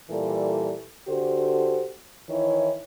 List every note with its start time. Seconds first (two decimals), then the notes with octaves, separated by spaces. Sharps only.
0.10 A#2 E3 G3 A4
1.08 D3 F#4 G4 A4 C5
2.29 D#3 E3 E4 C#5